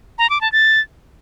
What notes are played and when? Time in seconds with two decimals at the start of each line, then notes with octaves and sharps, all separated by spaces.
0.18 A#5
0.30 D6
0.41 A5
0.52 A6